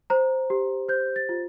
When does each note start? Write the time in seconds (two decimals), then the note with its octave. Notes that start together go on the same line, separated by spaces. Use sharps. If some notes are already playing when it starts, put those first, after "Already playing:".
0.10 C5 A#5
0.50 G4
0.88 C5 G6
1.16 A6
1.29 F4